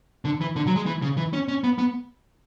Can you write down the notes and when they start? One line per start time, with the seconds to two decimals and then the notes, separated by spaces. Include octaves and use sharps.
0.25 D3
0.41 E3
0.56 D3
0.67 F#3
0.76 G#3
0.86 E3
1.02 C#3
1.17 E3
1.33 C#4
1.48 C#4
1.64 B3
1.78 B3